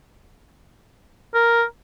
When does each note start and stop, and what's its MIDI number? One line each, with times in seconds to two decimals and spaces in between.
1.34 1.64 70